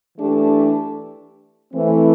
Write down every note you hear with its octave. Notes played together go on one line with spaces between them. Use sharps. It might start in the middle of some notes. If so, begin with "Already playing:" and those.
E3 A3 D4 G4
E3 A3 C4